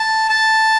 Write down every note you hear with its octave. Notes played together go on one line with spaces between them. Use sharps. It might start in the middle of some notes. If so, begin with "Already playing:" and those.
Already playing: A5
A5